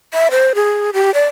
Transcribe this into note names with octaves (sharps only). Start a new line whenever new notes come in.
E5
C5
G#4
G4
D5